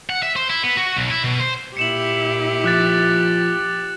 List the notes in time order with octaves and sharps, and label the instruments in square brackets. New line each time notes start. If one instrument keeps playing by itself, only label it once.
[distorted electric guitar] F#5
E5
C5
E4
B3
F#4
B1
E4
B2
C5
[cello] A#2 E4 [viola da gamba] G4 [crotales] C#7 E7 F#7
[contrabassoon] F3 [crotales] D6 F#6 A6